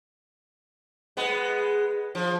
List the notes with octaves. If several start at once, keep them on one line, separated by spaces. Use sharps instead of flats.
G#3 B3
F3